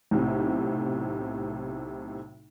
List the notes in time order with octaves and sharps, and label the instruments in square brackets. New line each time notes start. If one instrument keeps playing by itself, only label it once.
[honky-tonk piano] B1 A2 C3